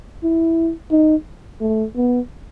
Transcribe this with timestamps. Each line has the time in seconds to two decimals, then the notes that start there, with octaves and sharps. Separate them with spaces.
0.23 E4
0.91 D#4
1.61 A3
1.96 B3